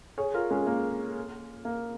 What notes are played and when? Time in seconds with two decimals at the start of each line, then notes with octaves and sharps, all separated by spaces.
0.18 G#4 C#5
0.34 F4 A#4
0.50 G#3 C#4
0.67 A#3
1.65 A#3